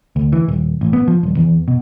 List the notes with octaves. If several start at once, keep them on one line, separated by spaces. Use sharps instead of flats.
D2
E3
D#1
A1
B3
F3
D#1
E2
B2